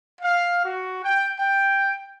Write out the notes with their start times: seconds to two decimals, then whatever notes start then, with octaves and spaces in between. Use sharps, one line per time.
0.21 F5
0.64 F#4
1.03 G5
1.39 G5